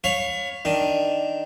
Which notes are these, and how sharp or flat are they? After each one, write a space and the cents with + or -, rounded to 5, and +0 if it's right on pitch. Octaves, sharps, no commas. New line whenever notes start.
C#5 +0 F5 +20 B5 +25
D#3 +0 D4 +0